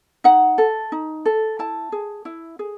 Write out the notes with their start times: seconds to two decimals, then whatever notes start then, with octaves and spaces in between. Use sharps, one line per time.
0.24 D#4 F#5
0.58 A4
0.92 D#4
1.25 A4
1.59 E4 A5
1.92 G#4
2.25 E4
2.59 G#4